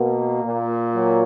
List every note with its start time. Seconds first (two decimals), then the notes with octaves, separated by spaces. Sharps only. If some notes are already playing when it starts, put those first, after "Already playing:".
Already playing: B2 A#3
0.44 A#2
0.94 F#3